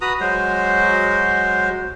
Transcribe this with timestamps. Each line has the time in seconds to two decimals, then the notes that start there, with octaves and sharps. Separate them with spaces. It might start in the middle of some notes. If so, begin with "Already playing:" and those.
0.01 F#4 B4 A#5 D#6
0.20 F#3 G#3 C5